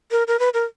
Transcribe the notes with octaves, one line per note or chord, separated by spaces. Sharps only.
A#4
A#4
B4
A#4